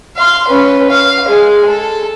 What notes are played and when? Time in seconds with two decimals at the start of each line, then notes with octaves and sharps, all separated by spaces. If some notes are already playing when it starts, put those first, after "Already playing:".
0.17 F5 C6
0.48 C#4 B4
0.91 F5
1.28 G#3 G#4
1.69 A4